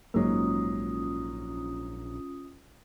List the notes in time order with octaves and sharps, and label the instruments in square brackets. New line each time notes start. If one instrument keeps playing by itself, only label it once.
[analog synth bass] A#1 [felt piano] G#2 F#3 [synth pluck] G#3 A#3 [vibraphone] C#4 F4 D#6